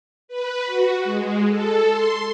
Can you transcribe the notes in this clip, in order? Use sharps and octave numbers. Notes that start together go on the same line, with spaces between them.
B4
F#4
G#3
A4
C6